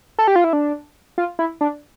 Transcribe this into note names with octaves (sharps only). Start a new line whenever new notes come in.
A4
G4
F4
E4
D4
F4
E4
D4